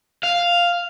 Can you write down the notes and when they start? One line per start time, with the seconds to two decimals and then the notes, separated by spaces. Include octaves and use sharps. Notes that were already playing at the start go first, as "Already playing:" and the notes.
0.23 F5